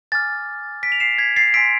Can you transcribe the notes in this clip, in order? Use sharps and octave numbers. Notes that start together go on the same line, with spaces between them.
G#5 D6 F6 A6
B6 D7
F7
C7 E7
G#6 B6
A6 C7
G#5 C6 E6 B6 D7